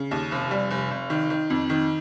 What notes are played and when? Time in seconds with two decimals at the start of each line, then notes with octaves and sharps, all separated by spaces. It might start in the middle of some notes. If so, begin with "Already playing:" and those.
Already playing: C#3
0.11 D#2
0.31 F1
0.51 G3
0.71 F1
0.91 F1
1.10 D#3
1.30 D#3
1.50 F2
1.70 D#3